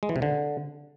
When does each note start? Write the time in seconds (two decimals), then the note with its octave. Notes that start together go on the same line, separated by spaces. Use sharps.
0.03 G#3
0.09 E3
0.16 C3
0.22 D3